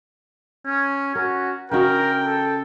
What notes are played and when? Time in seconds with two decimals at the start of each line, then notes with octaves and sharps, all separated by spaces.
0.66 C#4
1.15 C#4 F#4 A#4
1.71 C#3 D#4 F#4 A#4 G5
2.24 A4